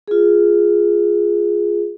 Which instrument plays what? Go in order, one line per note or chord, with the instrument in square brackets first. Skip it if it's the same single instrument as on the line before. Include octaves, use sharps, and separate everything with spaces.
[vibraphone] F4 G#4